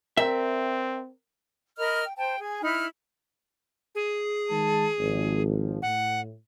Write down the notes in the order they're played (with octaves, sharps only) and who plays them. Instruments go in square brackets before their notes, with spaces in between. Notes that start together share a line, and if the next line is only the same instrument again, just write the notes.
[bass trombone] C4 [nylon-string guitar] A#4 D5 G5 [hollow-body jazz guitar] E5
[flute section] A#4 D#5 B5 F6
G5
C5 G5 A5
G#4 G#5
D#4 E4 B5 F6
[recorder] G#4
[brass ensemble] D#3 G#3 A5
G#1 F3
[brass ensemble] A2 [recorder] F#5